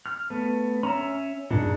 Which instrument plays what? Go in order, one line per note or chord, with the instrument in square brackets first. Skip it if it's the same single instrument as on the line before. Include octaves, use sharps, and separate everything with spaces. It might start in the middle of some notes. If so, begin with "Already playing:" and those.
[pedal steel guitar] F6
A3 B3
[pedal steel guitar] C#4 E5 [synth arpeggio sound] A#5
[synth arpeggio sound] G2 A#2 [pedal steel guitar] C#3 D4 D#4